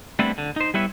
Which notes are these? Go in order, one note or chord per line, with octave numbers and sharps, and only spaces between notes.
G3 A3 B3 C4 D4 E4
D3
D#4 C5
G3 B3 E4 B4 C#5 E5